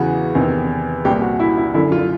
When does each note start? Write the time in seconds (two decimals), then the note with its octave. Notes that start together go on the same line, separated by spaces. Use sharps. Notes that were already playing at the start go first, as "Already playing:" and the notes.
Already playing: E2 C#3 E3 F#4
0.35 E2 C3 D#3
1.05 C2 A#2 G4
1.22 F#4
1.40 E4
1.57 E4
1.74 F#2 D3 E4
1.92 F4